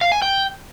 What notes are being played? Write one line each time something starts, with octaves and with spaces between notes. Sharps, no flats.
F5
G#5
G5